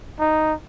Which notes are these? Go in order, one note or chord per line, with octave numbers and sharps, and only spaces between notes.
D#4